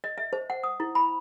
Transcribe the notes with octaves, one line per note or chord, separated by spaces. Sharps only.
D#5
E5
C5
F#5
D#6
E4
B5